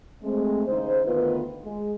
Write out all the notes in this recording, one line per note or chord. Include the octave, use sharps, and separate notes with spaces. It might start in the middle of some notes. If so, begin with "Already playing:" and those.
G#3 A3 C4
D#2 C#3 D#4 C5
D2 D#3 B3 F4 B4
G#3